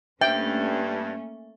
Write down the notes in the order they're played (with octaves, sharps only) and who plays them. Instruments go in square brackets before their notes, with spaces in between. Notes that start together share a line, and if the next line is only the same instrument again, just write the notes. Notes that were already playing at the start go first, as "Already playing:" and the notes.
[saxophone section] G2 [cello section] A3 A#3 C#4 [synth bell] E5 [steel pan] G5